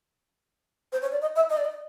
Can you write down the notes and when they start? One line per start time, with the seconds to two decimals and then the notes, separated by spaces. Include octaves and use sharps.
0.93 C5
1.02 C#5
1.12 D5
1.22 D#5
1.36 E5
1.50 D#5
1.58 D5
1.65 D#5